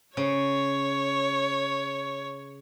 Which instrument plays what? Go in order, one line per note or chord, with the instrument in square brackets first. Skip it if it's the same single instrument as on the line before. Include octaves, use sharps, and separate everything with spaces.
[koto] C#3 [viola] C#5